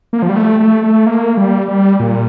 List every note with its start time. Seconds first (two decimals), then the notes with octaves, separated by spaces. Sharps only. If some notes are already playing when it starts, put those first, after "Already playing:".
0.13 A#3
0.22 F3
0.29 G3
0.36 A3
0.60 A3
0.84 A3
1.06 A#3
1.37 G3
1.68 G3
2.00 A#2